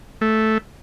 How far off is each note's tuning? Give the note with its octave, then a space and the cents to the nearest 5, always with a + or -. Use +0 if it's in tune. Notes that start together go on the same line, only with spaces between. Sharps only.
A3 -5